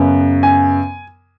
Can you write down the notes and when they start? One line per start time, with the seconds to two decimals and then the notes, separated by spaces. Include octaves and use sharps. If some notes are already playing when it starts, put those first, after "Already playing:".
Already playing: F#2 C#3 B3
0.43 G#5